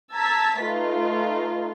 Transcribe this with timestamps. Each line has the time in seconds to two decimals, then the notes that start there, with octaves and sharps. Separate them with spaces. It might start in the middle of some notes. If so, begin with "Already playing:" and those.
0.13 A5 A#5 E6 G#6 A6 B6
0.62 A3 D#4 F4 B4